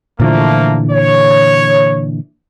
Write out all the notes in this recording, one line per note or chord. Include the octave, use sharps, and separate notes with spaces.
A#2 D3 E3 F3 A3 A#3
C#5